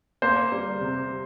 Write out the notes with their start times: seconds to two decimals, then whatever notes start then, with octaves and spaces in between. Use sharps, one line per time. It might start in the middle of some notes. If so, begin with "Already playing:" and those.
0.22 A#3 C5
0.52 G3
0.81 C3